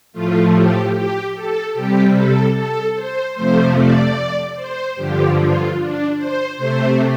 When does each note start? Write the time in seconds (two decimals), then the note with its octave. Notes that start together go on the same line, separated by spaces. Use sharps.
0.13 A2 F3 A3 F4
0.53 G4
0.94 G4
1.34 A4
1.74 C3 G3 G4
2.15 A4
2.55 A4
2.95 C5
3.35 F2 C3 F3 A3 C5
3.76 D5
4.55 C5
4.96 G2 D3 F3 G4
5.37 F4
5.77 D4
6.17 C5
6.57 C3 A3 C5